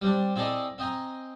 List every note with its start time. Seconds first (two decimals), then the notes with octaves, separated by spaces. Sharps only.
0.02 G3 C4 D4
0.35 C4 E4 G#4 A4 D5 D#5
0.78 C4 D#5 G5 G#5 A#5